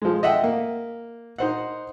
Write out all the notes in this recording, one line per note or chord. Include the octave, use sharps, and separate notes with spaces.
F3 G#3
D#5 E5 F#5 G5
A#3
D#4 C5 F#5